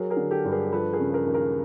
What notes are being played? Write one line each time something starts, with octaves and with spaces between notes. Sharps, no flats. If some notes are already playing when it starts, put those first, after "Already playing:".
Already playing: F#3 G#4 A#4
G#4 A#4
D3
G4 A4
G2
G#4 A#4
F3 A4 B4
G#4 A#4
C#3
G#4 A#4
D#2
G#4 A#4